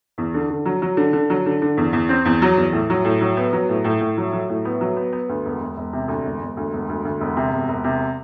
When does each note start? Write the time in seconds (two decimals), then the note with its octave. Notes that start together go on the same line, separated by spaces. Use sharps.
0.18 E2
0.34 D3
0.50 D3
0.65 F#3
0.82 F#3
0.97 D3
1.13 D3
1.30 F#3
1.46 D3
1.62 D3
1.77 E2
1.93 E2
2.09 C4
2.25 E2
2.42 F#3
2.57 E2
2.73 A2
2.90 F#3
3.05 A2
3.21 F#3
3.37 B3
3.53 F#3
3.69 A2
3.84 A2
4.01 A2
4.17 F#3
4.33 F#3
4.50 A2
4.65 B3
4.81 F#3
4.96 B3
5.12 B3
5.29 D2
5.45 E1
5.61 E1
5.77 E1
5.93 C3
6.08 D2
6.25 E1
6.41 E1
6.57 D2
6.73 E1
6.89 D2
7.05 D2
7.20 E1
7.37 C3
7.53 E1
7.68 E1
7.84 C3